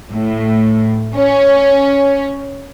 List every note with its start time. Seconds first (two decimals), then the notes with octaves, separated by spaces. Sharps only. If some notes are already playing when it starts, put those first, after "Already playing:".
0.11 A2
1.16 C#4